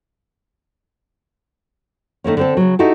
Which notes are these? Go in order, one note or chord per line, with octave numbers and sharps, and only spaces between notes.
D#3 A3 A#3 C#4
D3 C4 A4
C#3 F#3
D#4 E4 F#4 G4 A4